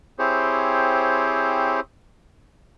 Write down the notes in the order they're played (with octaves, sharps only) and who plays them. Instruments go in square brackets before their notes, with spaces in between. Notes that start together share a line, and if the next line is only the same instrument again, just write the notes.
[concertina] C4 E4 G4 G#4 C5 C#5